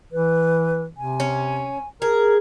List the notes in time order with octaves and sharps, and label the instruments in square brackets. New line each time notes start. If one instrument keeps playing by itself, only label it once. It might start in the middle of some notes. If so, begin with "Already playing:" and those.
[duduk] E3 [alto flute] B4
[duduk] C3 [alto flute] G#5
[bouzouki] C#4
[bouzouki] G#4 [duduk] A#4